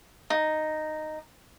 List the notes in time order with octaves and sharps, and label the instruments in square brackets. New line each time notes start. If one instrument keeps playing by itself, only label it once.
[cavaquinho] D#4